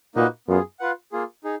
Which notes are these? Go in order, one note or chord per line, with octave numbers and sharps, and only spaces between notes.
A#2 A#3 D#4 F#4 B4 D#5
F#2 B3 F4 G#4
F4 B4 F#5
A#3 F4 G#4
D#4 G#4